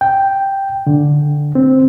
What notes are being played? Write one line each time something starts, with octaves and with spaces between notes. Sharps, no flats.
G5
D3
C4